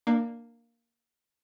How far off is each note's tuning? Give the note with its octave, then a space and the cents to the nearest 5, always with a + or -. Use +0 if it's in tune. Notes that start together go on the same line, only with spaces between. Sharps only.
A#3 +0 D4 +25